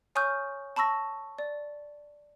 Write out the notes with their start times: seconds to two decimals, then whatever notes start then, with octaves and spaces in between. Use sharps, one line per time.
0.15 C#5 G#5 C#6 D#6 F6 G6
0.76 A5 B5 C#6 E6 A#6
1.38 D5